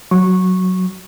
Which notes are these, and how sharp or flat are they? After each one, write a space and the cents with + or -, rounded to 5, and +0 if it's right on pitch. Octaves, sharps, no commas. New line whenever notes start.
F#3 +0 C#6 -15